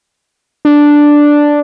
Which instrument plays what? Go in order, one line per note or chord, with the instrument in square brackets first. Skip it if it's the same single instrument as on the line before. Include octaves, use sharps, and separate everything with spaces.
[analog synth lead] D4